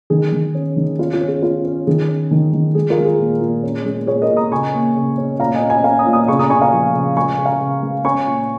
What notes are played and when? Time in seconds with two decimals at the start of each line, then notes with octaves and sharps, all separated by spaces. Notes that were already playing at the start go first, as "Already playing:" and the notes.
0.10 D#3 G#4
0.32 D#3
0.55 C#4
0.77 D#3
0.99 C#4 F4
1.13 F4
1.21 C#4
1.28 G#4
1.43 C#4 F4
1.65 C#4
1.87 D#3 G#4
2.09 C#4
2.31 D#3
2.53 D#3
2.75 G#3 G#4
2.90 F4 A#4
2.97 G#3
3.05 G#4
3.19 A#2
3.41 A#2
3.63 C#4
3.85 G#3
4.07 A#2 G#4 C#5
4.22 A#4 D#5
4.30 A#2
4.36 A#5 D#6
4.52 C#3 G#5 C#6
4.74 A#3
4.96 C#3
5.18 C#4
5.39 A#2 F5 A#5
5.54 D#5 G#5
5.61 C#4
5.69 D#5 G#5
5.84 C#4 F5 A#5
5.99 A#5 D#6
6.06 A#2
6.13 A#5 D#6
6.28 C#3 G#5 C#6
6.39 A#5 D#6
6.50 C#3 G#5 C#6
6.61 F5 A#5
6.73 F3
6.94 C#3
7.16 G#3 G#5 C#6
7.38 C#3
7.45 F5 A#5
7.60 C#3
7.82 G#3
8.05 C#4 G#5 C#6
8.27 A#2